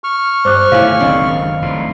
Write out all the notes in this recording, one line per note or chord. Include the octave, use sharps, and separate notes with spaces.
C#6 F6
G2 C5 D6 F#6
A2 D3 D#3 E4 G#4 C#5 F5
F#1 C#2 D#3 C4 D4
F1 A2